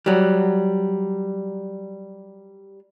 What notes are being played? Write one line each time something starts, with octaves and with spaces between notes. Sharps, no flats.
F#3 G3